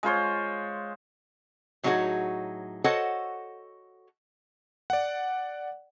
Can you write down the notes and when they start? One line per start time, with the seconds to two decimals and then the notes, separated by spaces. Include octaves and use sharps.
0.03 G#3 F4 C5 C#5
1.83 A2 F#3 D#4 F#4 G#4 C#5
2.84 F#4 A4 C5 C#5 D#5 F#5
4.90 D5 F#5